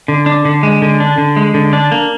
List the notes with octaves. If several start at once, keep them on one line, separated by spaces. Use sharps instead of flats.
D3
D4
D3
G#3
D3
D4
D3
G#3
D3
D4
A#3